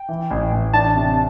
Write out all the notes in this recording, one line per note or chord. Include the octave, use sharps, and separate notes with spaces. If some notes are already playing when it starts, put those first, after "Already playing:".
Already playing: G5
E3
A1
A1
D4 A5
C3